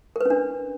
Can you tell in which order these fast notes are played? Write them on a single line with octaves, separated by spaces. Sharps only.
A#4 B4 C#4 D4